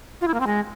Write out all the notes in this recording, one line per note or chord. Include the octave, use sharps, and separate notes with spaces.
F4
E4
A#3
C4
G#3